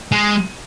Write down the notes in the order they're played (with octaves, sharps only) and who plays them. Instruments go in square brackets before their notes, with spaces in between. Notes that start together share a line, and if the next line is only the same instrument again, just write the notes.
[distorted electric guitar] G#3